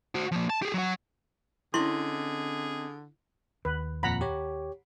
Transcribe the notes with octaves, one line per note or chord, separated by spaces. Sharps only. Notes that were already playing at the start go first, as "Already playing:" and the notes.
F#4 C5
F3 A#3
A5
G4 G#4
F#3 F#5
D3 C4 C#4 E4 G#4 D#5 C6 C#6
D#2 B4
F2 A#2 F#5 A#5 B5
G4 C#5